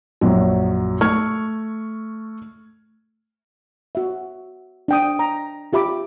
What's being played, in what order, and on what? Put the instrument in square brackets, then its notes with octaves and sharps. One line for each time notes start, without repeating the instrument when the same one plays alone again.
[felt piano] A#1 F#2 F#3
A3 C#6 F6 G#6
[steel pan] F#4 E5
D4 G5 D#6
A#5
F4 G4 E5 B5 D6